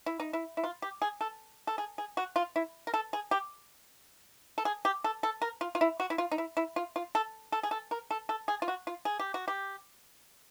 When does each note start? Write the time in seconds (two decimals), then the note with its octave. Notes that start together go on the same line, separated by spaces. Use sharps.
0.06 E4
0.20 D#4
0.33 E4
0.57 E4
0.64 F4
0.82 G4
1.02 G#4
1.21 A4
1.67 A4
1.78 G#4
1.98 G#4
2.17 F#4
2.36 F4
2.56 E4
2.87 A#4
2.94 A4
3.13 G#4
3.31 G4
4.58 A4
4.65 G#4
4.85 G4
5.04 A4
5.23 A4
5.42 A#4
5.61 F4
5.75 F4
5.81 E4
6.00 F#4
6.10 E4
6.18 F4
6.31 D#4
6.38 E4
6.57 E4
6.76 F4
6.96 F4
7.15 A4
7.52 A4
7.63 G#4
7.71 A4
7.91 A#4
8.11 A4
8.29 A4
8.48 G#4
8.62 F4
8.68 F#4
8.87 F4
9.05 G#4
9.19 G4
9.34 F#4
9.48 G4